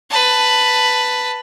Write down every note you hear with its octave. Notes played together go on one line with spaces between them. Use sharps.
B4 A5